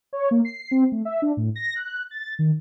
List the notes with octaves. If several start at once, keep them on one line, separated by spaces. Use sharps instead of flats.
C#5
A#3
C7
C4
A3
E5
D4
A2
A#6
F#6
A6
D#3